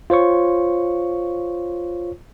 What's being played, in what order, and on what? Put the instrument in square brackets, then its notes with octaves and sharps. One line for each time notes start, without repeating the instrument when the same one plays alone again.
[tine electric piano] F4 C5 C#5 C#6